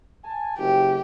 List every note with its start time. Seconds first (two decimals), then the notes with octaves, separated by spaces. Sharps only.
0.24 G#5 A5
0.58 F#1 G4